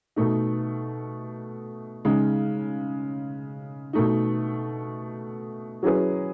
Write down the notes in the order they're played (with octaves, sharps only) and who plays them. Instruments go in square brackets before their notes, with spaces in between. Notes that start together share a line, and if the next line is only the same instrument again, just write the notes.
[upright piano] B2 A3 D#4
C#3 G#3 D#4
B2 A3 D#4
F#3 C#4 E4 G#4 B4